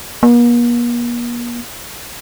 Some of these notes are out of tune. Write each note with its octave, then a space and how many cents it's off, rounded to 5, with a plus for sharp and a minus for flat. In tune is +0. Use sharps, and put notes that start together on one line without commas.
A#3 +45